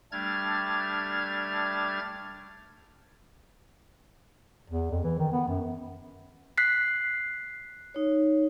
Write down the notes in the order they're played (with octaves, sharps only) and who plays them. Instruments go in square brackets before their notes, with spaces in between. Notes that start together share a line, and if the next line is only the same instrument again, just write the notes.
[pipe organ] G3 A3 D4 F6 G#6 A6
[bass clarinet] E2
F2
E3
D#3
B3
F#2
[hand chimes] F#6 B6 C7
[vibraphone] D#4 C#5